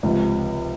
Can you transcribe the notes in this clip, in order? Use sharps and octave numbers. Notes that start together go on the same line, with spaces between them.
C#2 C3 F3